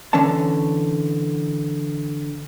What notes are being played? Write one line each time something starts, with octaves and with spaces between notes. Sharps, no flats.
D3 E3 C#4 C#5 A5